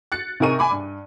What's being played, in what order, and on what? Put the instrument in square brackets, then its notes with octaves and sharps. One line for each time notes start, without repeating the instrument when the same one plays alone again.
[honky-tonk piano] F#6 A6 C#7
C3 D#4 G#4 A#4 C#6 D#7
G#5 B5 D6
G2